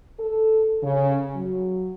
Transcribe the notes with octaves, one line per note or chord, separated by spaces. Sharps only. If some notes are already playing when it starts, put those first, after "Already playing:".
A4
C#3
F#3